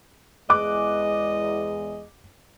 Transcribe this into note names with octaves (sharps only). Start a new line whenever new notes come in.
E2 G#3 D#5 D6 F#6